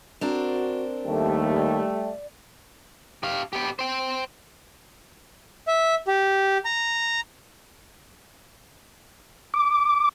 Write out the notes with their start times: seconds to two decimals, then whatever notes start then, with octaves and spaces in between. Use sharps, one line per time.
0.21 C4 D4 F#4 A#4
1.07 D#2 G3 A3 G4
1.55 D5
3.23 G4 F5
3.53 B3 G4
3.79 C5 G5
5.67 E5
6.07 G4
6.65 A#5
9.54 D6